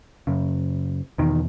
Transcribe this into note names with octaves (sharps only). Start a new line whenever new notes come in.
F#2 C#3
E2 B2 D#3